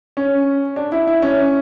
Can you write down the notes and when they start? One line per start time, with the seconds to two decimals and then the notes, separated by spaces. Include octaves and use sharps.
0.17 C#4
0.76 D4
0.92 E4
1.07 E4
1.22 C#4